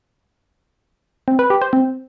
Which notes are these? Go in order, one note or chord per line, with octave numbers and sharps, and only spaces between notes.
C4
B4
G4
C5
C4